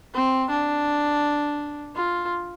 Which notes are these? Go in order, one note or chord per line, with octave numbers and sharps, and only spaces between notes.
C4
D4
F4